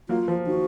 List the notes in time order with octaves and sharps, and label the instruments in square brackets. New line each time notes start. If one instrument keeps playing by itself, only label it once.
[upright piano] F#3 A#3 [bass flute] F4
[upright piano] F3
[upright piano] D#3 [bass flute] F#4